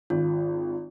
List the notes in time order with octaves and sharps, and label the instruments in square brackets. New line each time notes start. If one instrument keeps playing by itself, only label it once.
[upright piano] G#1 [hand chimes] F4